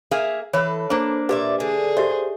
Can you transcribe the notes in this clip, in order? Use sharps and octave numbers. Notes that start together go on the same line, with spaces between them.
A#3 G#4 E5 F5
E3 A4 B4 C#5
A#3 D4 C5
A#2 G4 B4 D5 E5 F5
D3 G#4
G4 C5 D#5 E5